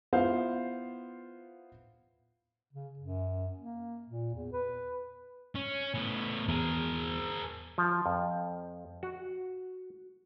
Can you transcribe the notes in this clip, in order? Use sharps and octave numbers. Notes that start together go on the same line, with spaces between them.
B3 E4 F4 C5 F5
C#3
F#2
A#3
A#2
E2
B4
C#4
A2 B3
E2 G#4 A#4
F3
F2
F#4